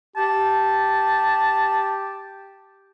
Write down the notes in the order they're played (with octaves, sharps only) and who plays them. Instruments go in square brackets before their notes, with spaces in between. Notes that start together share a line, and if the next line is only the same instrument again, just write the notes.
[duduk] G4 [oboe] A5